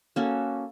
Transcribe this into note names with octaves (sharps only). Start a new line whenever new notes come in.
A#3 C#4 F#4 A4